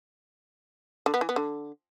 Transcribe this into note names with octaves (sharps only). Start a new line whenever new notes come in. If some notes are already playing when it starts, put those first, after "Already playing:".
D3
B3
E3
B3
D3